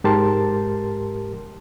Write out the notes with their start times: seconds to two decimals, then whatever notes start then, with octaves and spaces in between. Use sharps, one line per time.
0.04 G#2 G4 A#4 A5 C6